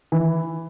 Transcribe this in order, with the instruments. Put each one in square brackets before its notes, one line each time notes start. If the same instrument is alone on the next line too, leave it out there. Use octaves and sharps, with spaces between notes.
[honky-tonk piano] E3